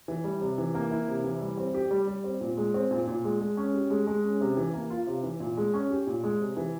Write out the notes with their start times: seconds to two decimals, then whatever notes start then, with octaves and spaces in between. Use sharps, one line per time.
0.08 E3
0.24 G3
0.41 C3
0.58 E3
0.75 A#3
0.91 E4
1.08 C3
1.24 E3
1.41 G3
1.57 C4
1.74 G4
1.91 G3
2.07 G3
2.24 C4
2.41 A#2
2.57 G#3
2.74 C4
2.91 A#2
3.07 A#2
3.24 G#3
3.41 G#3
3.57 C#4
3.74 G4
3.90 G#3
4.07 G#3
4.24 C#4
4.41 C3
4.57 E3
4.74 A#3
4.90 F4
5.07 C3
5.23 E3
5.40 A#2
5.57 G#3
5.74 C#4
5.90 G4
6.07 A#2
6.24 G#3
6.40 C3
6.57 E3